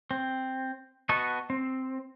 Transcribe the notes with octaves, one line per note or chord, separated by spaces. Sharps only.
C4
B3 F#4 D#5 A5 C#6
C4